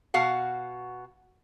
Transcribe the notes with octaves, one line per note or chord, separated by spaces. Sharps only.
B2 F#4 F5 F#5